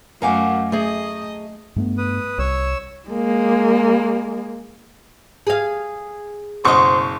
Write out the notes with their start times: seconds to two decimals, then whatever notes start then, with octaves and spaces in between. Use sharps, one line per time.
0.22 F#2 A3 D#4 A#4 F5 F#5 G#5 D6
0.72 A3 G#4 D#5
1.76 G2 A3 B3
1.98 B4 D#6
2.38 C2 C#5 E6
3.09 G#3 A#3
5.47 G#4 F5
6.65 F#1 B2 C5 D#5 C6 C#6